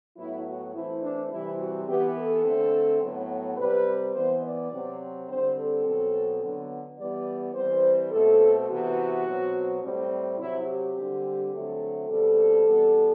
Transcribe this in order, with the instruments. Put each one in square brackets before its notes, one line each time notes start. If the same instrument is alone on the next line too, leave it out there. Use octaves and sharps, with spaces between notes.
[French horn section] A2 F#3 B3 E4
F#4
E3 A3 C4 E4
D4
C3 E3 G3 C4 E4
F#4
E3 B3 G4
A4
D3 A3 C4
A2 F#3 B3
C3 G3 C4 B4
E3 B3 C5
D5
C3 F#3 C4
D3 G3 C4 C5
A4
B2 F#3 C4
D3 F#3 B3
E3 G3 B3 D5
E3 G3 C4 C5
B2 A3 C4 A4
C3 E3 B3 F#4
B2 F#3 C4
A2 G3 C4
C3 F#3 C4 E4
G4
D3 G3 C4
D3 F#3 A3 C4
B2 G3 C4 A4
E3 G3 B3